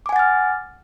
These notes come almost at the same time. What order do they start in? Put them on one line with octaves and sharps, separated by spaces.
D6 G#5 F#5 A6 F6